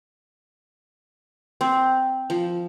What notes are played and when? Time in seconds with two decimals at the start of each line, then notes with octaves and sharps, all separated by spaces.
1.61 C4
2.30 F3